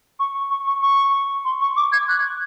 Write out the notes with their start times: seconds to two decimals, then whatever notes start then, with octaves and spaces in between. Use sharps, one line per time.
0.19 C#6
0.50 C#6
0.66 C#6
0.82 C#6
1.45 C6
1.61 C#6
1.76 D6
1.92 G#6
2.08 F#6